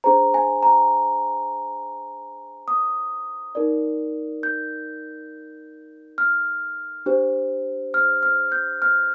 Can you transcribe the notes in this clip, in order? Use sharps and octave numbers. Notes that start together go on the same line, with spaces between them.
D4 G#4 C5 A#5
G#5
A#5
D#6
D#4 A#4 D5
G6
F6
D4 G4 C5
F6
F6
G6
F6